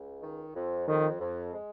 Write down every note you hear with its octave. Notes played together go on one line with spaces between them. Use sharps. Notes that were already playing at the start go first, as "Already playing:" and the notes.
Already playing: C#2
D#3
F2
F2 D#3
F2
G#3